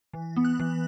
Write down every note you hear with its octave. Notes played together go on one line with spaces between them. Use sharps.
E3
B3
F#6
E3